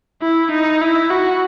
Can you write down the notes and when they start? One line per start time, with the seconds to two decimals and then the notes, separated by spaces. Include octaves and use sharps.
0.22 E4
0.52 D#4
0.81 E4
1.10 F#4